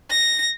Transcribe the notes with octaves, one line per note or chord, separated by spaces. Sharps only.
A#6